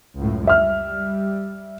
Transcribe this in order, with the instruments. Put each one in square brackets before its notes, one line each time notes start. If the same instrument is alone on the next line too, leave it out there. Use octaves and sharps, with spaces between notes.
[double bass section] C#2 F#2 A2
[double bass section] G3 [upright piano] E5 F6